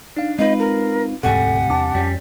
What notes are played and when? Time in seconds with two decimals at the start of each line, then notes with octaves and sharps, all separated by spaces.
0.16 D4 D#4 F5
0.39 G#3 C4 D#4 F4 B4 D#5
0.59 A#4
1.23 E1 D2 G#2 C3 G3 A4 F#5 G#5
1.70 E2 D4 A5 D6
1.95 F2 G3 C#4